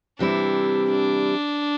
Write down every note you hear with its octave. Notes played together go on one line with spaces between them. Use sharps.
C3 E3 G3 C4 D4 E4
D4